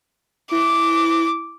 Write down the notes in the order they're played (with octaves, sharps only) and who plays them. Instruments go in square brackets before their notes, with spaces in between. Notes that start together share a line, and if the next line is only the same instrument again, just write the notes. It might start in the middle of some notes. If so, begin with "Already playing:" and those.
[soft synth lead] E4 [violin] D6